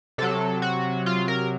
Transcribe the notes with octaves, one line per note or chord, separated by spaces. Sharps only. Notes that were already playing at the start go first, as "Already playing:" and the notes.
C3 F#3 A4
F#4
F4
A#4